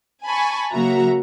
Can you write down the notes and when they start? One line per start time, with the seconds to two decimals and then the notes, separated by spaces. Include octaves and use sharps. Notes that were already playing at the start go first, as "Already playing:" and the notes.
0.25 G#5 A5 B5 C#6
0.72 C#3 F#3 A#3 F#4 E5 A#5